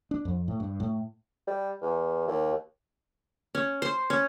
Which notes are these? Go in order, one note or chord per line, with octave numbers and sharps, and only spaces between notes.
D4
F2
A2
G2
A2
G3
E2
D#2
C#4
C5
C#4